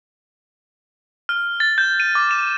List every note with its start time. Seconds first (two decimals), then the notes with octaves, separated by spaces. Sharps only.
1.29 F6
1.60 A6
1.78 G6
2.00 D#7
2.15 D6
2.31 E7